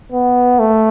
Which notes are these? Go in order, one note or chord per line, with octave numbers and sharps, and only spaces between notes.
B3
A3